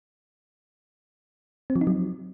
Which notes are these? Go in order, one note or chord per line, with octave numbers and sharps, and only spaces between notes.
C4
F3
D#4
F#3